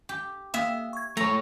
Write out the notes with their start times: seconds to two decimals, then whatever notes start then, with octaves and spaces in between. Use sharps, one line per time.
0.09 G4
0.54 A#3 E5 F5 G5
0.93 C#6 G#6
1.17 A3 C#5 A#5